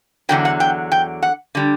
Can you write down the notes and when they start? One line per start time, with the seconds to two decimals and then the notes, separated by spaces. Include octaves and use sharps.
0.29 E2 D3 F#3 G5
0.45 F#5
0.60 G5
0.92 G5
1.22 F#5
1.55 D3 G3